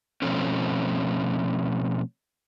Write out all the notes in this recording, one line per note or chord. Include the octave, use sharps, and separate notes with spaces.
B2 F3 A3 C4 C#4